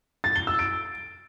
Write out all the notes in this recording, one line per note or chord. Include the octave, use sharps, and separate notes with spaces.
A6
G7
E6
D7